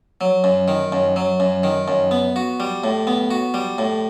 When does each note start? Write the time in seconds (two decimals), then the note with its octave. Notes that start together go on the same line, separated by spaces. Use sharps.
0.21 F#3
0.44 F#2
0.68 D#3
0.92 F#2
1.16 F#3
1.40 F#2
1.63 D#3
1.88 F#2
2.11 B3
2.36 F#4
2.60 G3
2.84 A2
3.07 B3
3.31 F#4
3.54 G3
3.78 A2